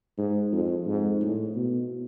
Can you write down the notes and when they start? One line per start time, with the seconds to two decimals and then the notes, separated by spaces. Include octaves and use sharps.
0.18 G#2
0.52 F2
0.87 G#2
1.21 A2
1.56 B2